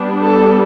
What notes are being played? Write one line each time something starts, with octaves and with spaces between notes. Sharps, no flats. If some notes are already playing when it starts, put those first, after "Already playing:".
Already playing: G3 B3 D4
A4